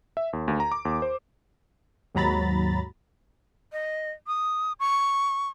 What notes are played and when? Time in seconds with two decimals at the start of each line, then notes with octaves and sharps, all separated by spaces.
0.17 E5
0.33 D#2
0.48 D2
0.60 A#5
0.72 D6
0.85 D#2
1.02 C5
2.15 D#2 G#2 F#3 A#5 B5 A6
3.72 D#5
4.27 D#6
4.80 C#6